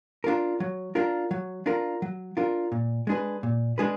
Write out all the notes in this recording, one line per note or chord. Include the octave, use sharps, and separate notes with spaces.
D4 F4 A#4
F#3
D4 F4 A#4
F#3
D4 F4 A#4
F#3
D4 F4 A#4
A#2
G#3 D4 G#4 B4
A#2
G#3 D4 G#4 B4